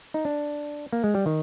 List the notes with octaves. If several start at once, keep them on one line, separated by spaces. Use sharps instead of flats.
D#4
D4
A#3
G#3
G3
D#3